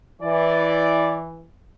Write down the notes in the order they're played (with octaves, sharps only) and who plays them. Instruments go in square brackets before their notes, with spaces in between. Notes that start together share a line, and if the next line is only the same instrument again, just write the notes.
[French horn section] E3 [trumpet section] D5